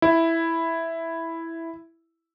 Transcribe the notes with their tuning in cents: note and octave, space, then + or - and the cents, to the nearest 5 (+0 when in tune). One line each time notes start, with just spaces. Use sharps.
E4 +0